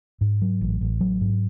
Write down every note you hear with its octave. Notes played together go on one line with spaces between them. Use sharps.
G#2
F#3
A1
A1
F#3
G#2